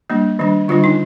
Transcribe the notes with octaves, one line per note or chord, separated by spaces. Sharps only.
G3 A#3 D4
D#3 G3 D4
D3 G3 D4 F4
D#4